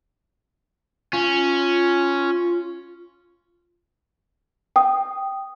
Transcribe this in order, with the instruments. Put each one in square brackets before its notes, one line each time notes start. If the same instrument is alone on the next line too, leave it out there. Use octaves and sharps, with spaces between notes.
[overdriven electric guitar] C#4 [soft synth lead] F4
[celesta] G5 D#6